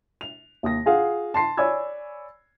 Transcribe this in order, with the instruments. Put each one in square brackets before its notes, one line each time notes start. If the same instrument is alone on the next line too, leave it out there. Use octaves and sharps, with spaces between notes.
[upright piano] F7
D#2 D#6 A#6
F4 G#4 F5 F#5
A5 C6 C7
C#5 D5 G#5 B5 E6 G#6